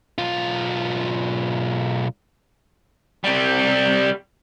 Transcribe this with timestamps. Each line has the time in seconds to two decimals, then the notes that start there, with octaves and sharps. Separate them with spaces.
0.18 B1 F4
3.24 C3 G3